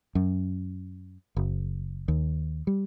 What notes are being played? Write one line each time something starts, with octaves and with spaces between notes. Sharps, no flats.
F#2
F#1
D#2
G3